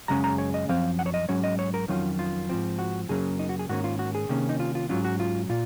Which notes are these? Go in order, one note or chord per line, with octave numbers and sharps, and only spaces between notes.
F#2 C#3 G#3 C#4 A#5
A#5
C#5
D#5
F#2 F3 C4 F5
F#5
C#5
D#5
G#2 F#3 C#4 C#5
D#5
C#5
A#4
F2 D#3 F#3 C#4 F4
F4
G#2 F3 C4
F#4
F#2 C#3 F#3 A#3 C#4 G#4
D#4
F#4
G#4
G#2 D#3 A#3 C#4 F#4
F4
F#4
G#4
C3 D#3 A#3 C#4
D#4
F4
F4
G#2 F#3 C#4 F4
F#4
F4
A#2 F4